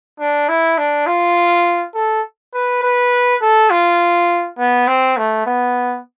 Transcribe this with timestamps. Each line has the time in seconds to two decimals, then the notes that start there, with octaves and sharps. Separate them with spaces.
0.20 D4
0.49 E4
0.78 D4
1.07 F4
1.95 A4
2.54 B4
2.83 B4
3.41 A4
3.70 F4
4.58 B3
4.87 C4
5.17 A3
5.46 B3